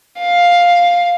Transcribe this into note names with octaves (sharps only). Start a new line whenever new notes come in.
F5